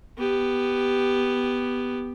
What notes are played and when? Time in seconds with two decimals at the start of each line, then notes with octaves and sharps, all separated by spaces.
0.18 B3 G4